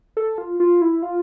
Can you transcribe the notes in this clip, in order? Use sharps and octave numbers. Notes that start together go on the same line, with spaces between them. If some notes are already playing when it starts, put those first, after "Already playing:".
A4
F4
F4
E4
F4